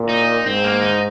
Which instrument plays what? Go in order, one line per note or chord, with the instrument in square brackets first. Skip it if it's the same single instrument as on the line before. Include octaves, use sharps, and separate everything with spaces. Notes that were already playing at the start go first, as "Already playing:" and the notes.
Already playing: [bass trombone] A#2
[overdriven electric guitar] D#4
[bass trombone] G#2 [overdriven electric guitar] C4
[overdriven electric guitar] A#3
D#4